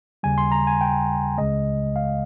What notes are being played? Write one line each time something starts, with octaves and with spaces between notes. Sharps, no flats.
D#2 C#3 G3 G#5
C6
A#5
G#5
G5
C#2 C#3 G#3 D#5
F5